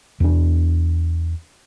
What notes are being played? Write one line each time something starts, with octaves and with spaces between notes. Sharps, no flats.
E2 D4